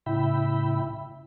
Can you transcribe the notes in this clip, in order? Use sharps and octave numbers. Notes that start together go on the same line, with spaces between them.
A2 C#3 E4 E5 G5 B5